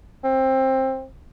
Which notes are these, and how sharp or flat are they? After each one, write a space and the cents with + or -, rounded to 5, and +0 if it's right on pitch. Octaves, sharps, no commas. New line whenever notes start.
C4 +20